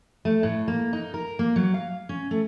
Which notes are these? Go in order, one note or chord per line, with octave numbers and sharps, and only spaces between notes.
A3
A2
A#3
D#4
A#4
A#3
F#3
F5
C#4
A3